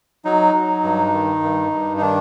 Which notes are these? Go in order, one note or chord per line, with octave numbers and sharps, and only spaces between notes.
F#3 D#4
F#3
G2
D#3
G2
G2
D#4
D#3 D4